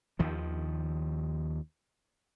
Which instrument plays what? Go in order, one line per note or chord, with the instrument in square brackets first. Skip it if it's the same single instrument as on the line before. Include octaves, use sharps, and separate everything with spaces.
[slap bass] D#2 D#3 F3